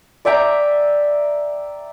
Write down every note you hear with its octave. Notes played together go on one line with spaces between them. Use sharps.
D5 E5 G5 A#5